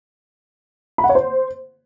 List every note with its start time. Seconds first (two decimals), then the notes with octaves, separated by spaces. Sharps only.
0.98 B5
1.04 F#5
1.09 C#5
1.15 C5